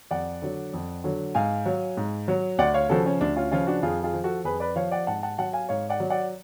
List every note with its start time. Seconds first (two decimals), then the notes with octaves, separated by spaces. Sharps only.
0.11 F2 D5 F#5
0.42 D3 F#3
0.74 F2
1.04 D3 F#3
1.35 G#2 F5 G#5
1.66 F#3
1.97 G#2
2.28 F#3
2.58 D2 D5 F#5
2.74 C#5 F5
2.89 C#3 F3 F#4 A4
3.06 C#4
3.21 D2 D4
3.36 C#4 F4
3.51 C#3 F3 C#4 F4
3.67 D4 F#4
3.83 F2 F4 G#4
4.03 F4 G#4
4.14 F3
4.24 F#4 A4
4.44 F2 G#4 B4
4.60 B4 D5
4.76 F3 C#5 F5
4.91 D5 F#5
5.07 G#2 F#5 A5
5.23 F#5 A5
5.38 F#3 F#5 A5
5.53 F5 G#5
5.69 G#2 C#5 F5
5.89 D5 F#5
6.00 F#3
6.10 D5 F#5